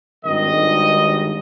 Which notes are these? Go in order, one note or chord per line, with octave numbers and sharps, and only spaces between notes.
G#1 G2 D#3 D#5